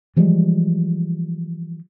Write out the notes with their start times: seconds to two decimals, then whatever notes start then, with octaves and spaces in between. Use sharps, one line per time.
0.16 E3 F3 G3 G#3